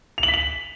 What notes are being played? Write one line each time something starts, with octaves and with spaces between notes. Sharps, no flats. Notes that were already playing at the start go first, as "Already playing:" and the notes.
F7
F#7
B6
F#7